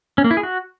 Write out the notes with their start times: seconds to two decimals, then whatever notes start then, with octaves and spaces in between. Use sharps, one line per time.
0.18 C#4
0.24 A#3
0.31 E4
0.37 G#4
0.43 F#4